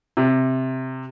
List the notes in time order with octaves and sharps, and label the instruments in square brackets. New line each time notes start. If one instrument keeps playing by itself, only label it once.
[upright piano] C3